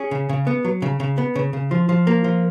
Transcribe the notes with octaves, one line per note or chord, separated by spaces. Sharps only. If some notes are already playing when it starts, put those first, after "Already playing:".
Already playing: C#4 G#4
C#3
C#3
B3
F#3
C#3
C#3
B3
C#3
C#3
F3
F3
A#3
F3